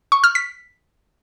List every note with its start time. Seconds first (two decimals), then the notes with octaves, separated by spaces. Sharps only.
0.12 C#6
0.24 F6
0.35 B6